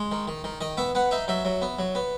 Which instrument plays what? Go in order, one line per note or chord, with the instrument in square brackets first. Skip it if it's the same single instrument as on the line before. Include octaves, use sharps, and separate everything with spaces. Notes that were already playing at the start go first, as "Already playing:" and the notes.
Already playing: [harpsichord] G#3
D#3
D#3
D#3
D#3 D#5
B3 E5
B3 F#5
D#4 E5
F#3 E5
F#3
B3
F#3
B3